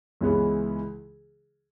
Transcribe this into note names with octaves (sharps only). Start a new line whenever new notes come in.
C#2 C#3 E3 G#3 B3